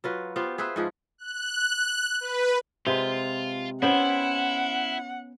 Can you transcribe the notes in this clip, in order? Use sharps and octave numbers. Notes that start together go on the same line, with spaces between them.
F#3 F4 B4
B3 F4 G4 C5
G#4 B4 C5 E5
G#2 F3 G#4
F#6
B4
C3 G#3 F4 B4
B3 C#4 E4 C5 F#5 G5